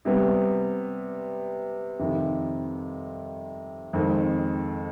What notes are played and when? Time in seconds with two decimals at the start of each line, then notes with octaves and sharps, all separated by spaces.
0.05 C3 G3 B3
1.99 F2 C3 D#3
3.93 F2 D#3 G#3 C4